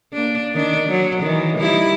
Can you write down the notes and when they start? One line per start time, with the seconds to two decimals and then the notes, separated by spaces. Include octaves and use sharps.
0.14 A#3 D4
0.54 D#3 D4
0.88 F#3
1.22 D#3 E3
1.57 G3 D#4 E4